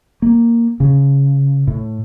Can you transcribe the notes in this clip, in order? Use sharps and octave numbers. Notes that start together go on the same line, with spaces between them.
A#3
C#3
A2